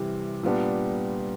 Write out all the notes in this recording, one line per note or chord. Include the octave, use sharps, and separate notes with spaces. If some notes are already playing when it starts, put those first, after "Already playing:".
Already playing: C3 E3 G3
A#2 G3 B3 D4